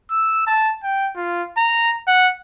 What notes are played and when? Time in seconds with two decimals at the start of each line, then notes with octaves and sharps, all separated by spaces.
0.11 E6
0.47 A5
0.84 G5
1.16 F4
1.57 A#5
2.08 F#5